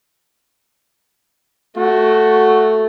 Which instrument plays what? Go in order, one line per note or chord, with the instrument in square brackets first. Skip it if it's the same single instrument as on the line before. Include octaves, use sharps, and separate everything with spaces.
[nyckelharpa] A3 [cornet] F#4